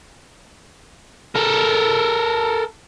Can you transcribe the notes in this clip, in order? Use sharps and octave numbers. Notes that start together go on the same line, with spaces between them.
A4 A#4